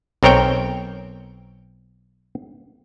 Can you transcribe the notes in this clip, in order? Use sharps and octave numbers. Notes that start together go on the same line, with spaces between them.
B1 C4 A#4 C#5 G5